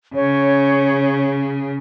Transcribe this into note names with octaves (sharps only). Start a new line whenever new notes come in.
C#3 C#5